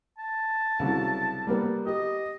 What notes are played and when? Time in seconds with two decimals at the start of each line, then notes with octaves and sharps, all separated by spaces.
0.18 A5
0.79 C2 C#3 F#3
1.47 G3 A#3 B3
1.87 G4 D#5